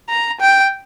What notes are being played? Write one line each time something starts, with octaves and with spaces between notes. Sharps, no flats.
A#5
G5